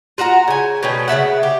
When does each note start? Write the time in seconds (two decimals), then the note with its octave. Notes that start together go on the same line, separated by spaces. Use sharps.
0.18 F4 F#4 F#5 A#5
0.48 C#3 G#5
0.83 B2 A3 C#4 G5
1.08 C#3 B3 E5 F#5
1.43 G4